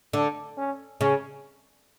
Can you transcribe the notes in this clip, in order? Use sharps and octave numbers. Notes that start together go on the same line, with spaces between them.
D3 D4
C#4
C#3 C#4